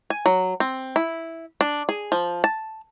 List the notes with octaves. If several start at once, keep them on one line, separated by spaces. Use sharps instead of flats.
G#5
F#3
C4
E4
D4
G#4
F3
A5